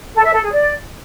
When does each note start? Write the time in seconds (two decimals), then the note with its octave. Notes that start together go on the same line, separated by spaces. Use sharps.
0.14 A4
0.24 E5
0.33 A4
0.42 G#4
0.51 D5